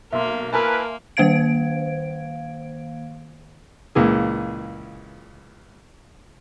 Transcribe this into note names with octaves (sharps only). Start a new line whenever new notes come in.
B1 A#3 E5 C6
A#3 E4 A#4 B4 G#5 A5
D#3 A#3 C5 F5 G#6 D7
C#2 A#2 E3 G#4